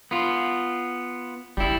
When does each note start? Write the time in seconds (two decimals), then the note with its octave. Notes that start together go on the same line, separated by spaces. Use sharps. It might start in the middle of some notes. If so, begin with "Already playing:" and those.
0.11 B3 F4
1.57 F#1 G3 E4